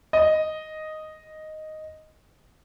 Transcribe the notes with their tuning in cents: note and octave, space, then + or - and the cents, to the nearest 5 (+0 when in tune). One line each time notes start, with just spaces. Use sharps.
D#5 +0